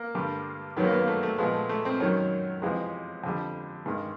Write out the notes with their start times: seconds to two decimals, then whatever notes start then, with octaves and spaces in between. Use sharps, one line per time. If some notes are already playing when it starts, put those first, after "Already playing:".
Already playing: A#3
0.15 G2 D3 G3
0.77 F#2 D#3 F#3 B3
0.85 A#3
0.92 B3
1.01 A#3
1.07 A3
1.23 A3
1.38 A#2 F3 G#3 B3
1.54 A3
1.69 A3
1.85 C4
2.00 F#2 D#3 F#3 C#4
2.62 F2 C3 E3 G#3
3.24 F2 D3 G3
3.86 G2 D#3 G#3